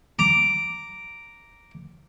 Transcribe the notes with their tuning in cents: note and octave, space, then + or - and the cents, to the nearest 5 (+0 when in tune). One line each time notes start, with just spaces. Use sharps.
A#5 +0 D6 -5